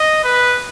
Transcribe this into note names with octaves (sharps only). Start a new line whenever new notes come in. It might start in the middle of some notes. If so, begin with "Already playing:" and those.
Already playing: D#5
B4